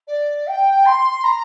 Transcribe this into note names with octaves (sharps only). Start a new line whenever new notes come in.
D5
G5
C6
A#5